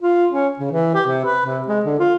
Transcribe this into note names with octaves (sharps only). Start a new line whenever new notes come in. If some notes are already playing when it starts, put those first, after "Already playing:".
F4
C#4
C#3
E3
G4
C3
B4
C3
G#3
D3
F4